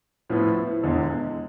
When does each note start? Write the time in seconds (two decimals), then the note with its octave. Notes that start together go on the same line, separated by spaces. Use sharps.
0.30 A2 F3 B3 E4
0.83 E1 E2 D3 G#3